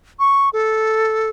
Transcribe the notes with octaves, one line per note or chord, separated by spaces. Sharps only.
C#6
A4